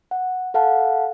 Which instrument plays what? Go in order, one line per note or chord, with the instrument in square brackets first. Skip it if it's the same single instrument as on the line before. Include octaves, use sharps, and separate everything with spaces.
[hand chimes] F#5
A4 F5 F#5 A5